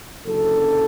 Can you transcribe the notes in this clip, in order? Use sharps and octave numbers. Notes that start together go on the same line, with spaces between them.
F#1 F#2 D3 A4